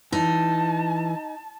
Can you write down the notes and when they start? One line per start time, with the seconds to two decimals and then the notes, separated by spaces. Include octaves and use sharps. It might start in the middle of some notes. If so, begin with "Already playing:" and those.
0.13 E3 D#4 A5